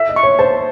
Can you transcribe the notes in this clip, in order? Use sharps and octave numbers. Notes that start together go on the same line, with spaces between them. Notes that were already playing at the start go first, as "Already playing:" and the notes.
Already playing: E5
D#5
C#6
C#5
C5 A5